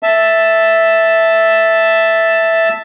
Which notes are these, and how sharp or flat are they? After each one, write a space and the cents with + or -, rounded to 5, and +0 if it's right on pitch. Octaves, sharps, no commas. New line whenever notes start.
E5 +0 A5 +0